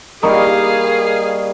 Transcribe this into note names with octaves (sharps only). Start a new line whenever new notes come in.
G3 A#3 D#4 G#4 A#4 F5 C#6